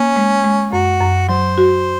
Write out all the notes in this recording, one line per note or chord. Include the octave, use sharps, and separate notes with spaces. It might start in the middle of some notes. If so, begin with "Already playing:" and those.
Already playing: A#3 C#4
G#3
G#3
F#2 F#4
F#2
F#3 C5
F#4